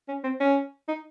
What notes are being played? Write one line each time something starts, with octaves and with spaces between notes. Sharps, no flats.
C#4
C4
C#4
D#4